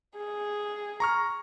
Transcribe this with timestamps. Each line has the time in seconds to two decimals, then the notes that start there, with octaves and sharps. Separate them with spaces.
0.17 G#4
1.00 A#5 C#6 F6